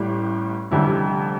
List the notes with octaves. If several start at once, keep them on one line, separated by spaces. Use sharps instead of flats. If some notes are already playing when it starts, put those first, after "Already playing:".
Already playing: A1 A2 G3
F1 F2 D3 G3 E4